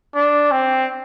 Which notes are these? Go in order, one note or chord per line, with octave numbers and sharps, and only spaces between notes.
D4
C4